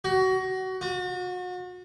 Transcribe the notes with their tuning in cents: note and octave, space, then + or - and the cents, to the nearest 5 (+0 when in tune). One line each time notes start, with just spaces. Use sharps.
F#4 +25
F#4 -35